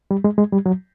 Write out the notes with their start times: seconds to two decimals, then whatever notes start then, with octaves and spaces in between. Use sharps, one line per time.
0.11 G3
0.24 G#3
0.38 G#3
0.52 G3
0.66 F#3